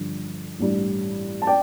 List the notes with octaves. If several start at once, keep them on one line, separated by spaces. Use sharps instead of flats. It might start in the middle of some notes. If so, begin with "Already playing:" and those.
Already playing: G2 D3 F3
A1 G2 G3
A5
D5 G5